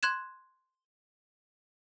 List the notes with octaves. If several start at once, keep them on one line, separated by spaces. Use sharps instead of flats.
C6 F#6 G#6 E7